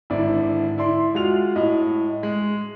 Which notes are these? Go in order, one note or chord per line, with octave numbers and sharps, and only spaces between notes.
G#1 D3 E4 D5
E4 D5 C6
G#3 F4 F#4 F7
A2 D#5
G#3